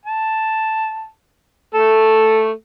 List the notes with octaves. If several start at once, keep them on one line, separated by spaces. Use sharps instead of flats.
A5
A3 A4